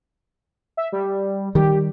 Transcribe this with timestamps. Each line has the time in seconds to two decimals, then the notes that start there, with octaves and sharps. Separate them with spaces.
0.77 E5
0.92 G3
1.55 D#3 G3 G4